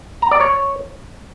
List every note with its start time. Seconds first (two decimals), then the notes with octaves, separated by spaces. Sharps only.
0.22 A#5
0.31 D5
0.41 C#5